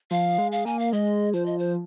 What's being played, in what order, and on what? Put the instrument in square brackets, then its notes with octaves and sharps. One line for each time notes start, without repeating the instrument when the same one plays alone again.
[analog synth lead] F3 [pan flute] F5
[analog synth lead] G#3
[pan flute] F5
[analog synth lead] A#3 [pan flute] G#5
[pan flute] F5
[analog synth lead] G#3 [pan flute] D#5
[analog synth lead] F3 [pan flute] C5
[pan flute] D#5
C5